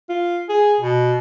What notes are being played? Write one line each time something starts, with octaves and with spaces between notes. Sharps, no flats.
F4
G#4
B2